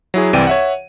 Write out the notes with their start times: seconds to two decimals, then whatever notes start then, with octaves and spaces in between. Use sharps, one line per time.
0.14 F#3 E4 G#4
0.33 C2 E3 C4 D5 G5 D#7
0.47 C#5 E5 F#5